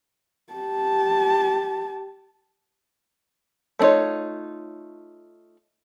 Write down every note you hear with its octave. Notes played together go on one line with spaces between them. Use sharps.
G4 A5
A3 D4 D#4 F4 C#5